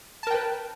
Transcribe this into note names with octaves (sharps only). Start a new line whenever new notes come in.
A#4 B4 G5 A5